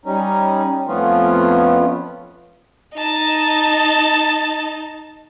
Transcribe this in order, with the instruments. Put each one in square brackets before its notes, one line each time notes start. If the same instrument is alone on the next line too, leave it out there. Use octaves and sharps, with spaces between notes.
[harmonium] G3 C#4 D#4
F2 F3 A3 B3 C#4 F4
[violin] D#4 A5